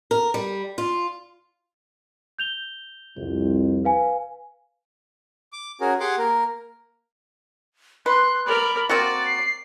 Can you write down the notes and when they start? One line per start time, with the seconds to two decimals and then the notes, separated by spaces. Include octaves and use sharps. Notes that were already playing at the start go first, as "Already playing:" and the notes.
0.11 A#4
0.34 G3
0.78 F4
2.39 G6 F7 G7
3.17 C2 F2
3.84 B4 F5 G#5
5.53 D6
5.81 C#4 F#4 G#4 A#4
6.00 G4 G#4 F#5 C6 D6
6.18 A#3 A#4
8.06 B4 C6 F#6
8.46 A#4 D5 B5
8.89 A#3 C4 F#4 D5 A6
9.26 C7